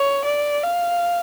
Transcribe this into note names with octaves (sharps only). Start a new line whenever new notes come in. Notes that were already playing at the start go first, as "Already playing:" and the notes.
Already playing: C#5
D5
F5